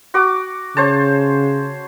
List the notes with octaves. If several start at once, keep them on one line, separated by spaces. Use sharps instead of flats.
F#4 D6
C#3 C5 C#5 A5